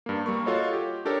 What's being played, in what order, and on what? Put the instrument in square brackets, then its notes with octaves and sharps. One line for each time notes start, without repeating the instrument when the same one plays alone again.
[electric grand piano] G2 A#3
G3 A#3 C#6
F4 F#4 A4 C#5 D#5
G4
D4 G4 A4 A#4 C#5